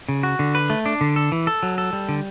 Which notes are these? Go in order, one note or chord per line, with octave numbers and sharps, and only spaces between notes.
C#3
F#4
D3
B4
A3
D4
D3
A4
E3
A4
F#3
A4
G3
D3